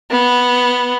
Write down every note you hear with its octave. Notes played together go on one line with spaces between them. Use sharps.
B3